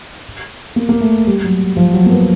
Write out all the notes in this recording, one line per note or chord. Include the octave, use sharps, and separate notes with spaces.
A#3
A#3
A3
G3
F#3
F3
F#3
A#3
B3